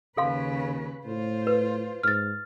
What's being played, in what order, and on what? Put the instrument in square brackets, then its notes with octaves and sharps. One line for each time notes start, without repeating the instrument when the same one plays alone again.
[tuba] D#2 [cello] C#3 B4 [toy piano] A4 F5 C6
[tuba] A2 [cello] F4 C5
[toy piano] B4
[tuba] G#2 [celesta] F6 A6